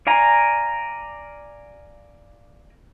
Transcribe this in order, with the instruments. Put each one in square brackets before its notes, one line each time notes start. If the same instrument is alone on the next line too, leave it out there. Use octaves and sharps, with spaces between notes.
[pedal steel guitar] D5 F5 G#5 A#5